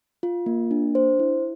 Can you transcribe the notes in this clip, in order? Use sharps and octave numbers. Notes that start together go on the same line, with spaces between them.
F4
A#3
D4
C5
E4